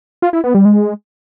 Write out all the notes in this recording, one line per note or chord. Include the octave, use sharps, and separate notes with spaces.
F4
E4
B3
G3
G#3